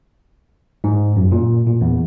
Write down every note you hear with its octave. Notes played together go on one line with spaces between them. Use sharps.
G#2
F#2
A#2
A#2
E2